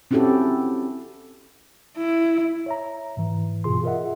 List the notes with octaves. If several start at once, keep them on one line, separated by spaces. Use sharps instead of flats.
C4 C#4 E4 F#4 G4 A4
E4
C#5 E5 A#5
G#2 E3
G2 B2 F4 G#4 C6
F4 G#4 A#4 D#5 E5 F#5